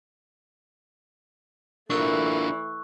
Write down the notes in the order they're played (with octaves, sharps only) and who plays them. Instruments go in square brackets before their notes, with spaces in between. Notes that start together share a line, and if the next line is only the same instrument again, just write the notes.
[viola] E3 A3 [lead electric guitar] D4 F4 [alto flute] A#4 [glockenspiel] C#6 E6 F#6